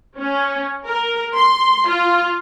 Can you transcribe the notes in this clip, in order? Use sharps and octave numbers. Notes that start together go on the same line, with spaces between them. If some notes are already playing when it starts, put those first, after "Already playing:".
C#4
A#4
C6
F4